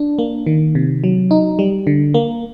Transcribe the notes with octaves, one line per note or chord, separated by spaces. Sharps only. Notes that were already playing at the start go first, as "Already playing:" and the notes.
Already playing: D4
A#3
D#3
C3
F#3
D#4
G3
D3
A#3